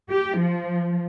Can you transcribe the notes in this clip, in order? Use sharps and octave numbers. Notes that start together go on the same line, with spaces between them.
G4
F3